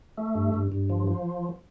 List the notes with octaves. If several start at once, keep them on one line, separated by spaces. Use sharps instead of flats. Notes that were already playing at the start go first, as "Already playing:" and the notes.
A3
G2
G2
G2
F3
F3